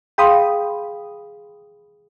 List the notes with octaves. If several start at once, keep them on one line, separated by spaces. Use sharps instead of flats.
G#4 F5 G5 B5 C6 D#6